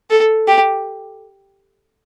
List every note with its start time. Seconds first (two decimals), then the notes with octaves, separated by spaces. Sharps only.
0.10 A4
0.48 G4